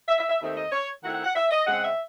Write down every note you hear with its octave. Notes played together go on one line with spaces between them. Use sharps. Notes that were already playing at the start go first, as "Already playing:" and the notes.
E5
E5
E5
D#2 D#3 A3 C4 D#4 E5
D#5
C#5
D#3 A3 C4 E4 F#5
F#5
F#5
E5
D#5
C#3 G#3 C4 F#5
E5